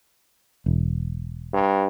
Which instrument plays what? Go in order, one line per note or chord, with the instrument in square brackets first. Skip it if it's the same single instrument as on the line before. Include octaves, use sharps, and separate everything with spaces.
[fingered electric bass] E1
[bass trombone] G2